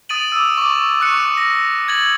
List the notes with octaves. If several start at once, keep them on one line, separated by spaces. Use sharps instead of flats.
D#6 A6 D7 D#7 F#7
D6 E6
C#6 D6
C#6 F#6 C#7
A#6
G#6 A6 F#7